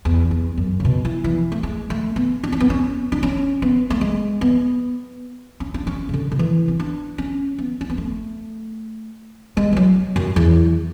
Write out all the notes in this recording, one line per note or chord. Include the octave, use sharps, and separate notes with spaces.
E2
E2
F#2
C#3
B2
E3
E3
A3
G#3
A3
B3
D4
C#4
B3
C#4
D4
C#4
B3
A3
G#3
B3
C#4
D4
C#4
C#3
D3
D3
E3
C#4
D4
C#4
B3
C#4
B3
A3
G#3
E3
F#3
F#2
E2